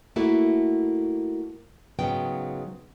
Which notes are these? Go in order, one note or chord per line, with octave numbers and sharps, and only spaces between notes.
A3 A#3 E4 F#4 A4
G#2 C#3 F#3 B3 G5